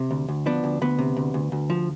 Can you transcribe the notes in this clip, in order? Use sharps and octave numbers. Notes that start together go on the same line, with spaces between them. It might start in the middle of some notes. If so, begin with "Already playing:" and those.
Already playing: C3
D2
D2
F3 B3 D4
D2
D2 B3
C3
D2
D2
D2
F3